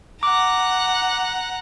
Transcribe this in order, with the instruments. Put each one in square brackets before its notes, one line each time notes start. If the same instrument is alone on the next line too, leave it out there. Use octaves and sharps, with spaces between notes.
[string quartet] F#5 A#5 [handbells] D6